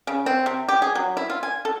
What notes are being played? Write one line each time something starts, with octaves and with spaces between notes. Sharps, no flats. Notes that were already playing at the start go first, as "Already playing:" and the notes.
C#3
C4
C3
G4
G#4
F#3
E4
F4
G#5
A4